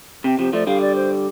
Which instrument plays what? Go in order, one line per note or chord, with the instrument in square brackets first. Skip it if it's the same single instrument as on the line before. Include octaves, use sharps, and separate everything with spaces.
[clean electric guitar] C3 [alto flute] G5
[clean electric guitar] C3 F3 [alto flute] G4
[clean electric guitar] F3 A3 [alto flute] D5
[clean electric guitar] D3 G3 [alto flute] F5
[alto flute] D5
C5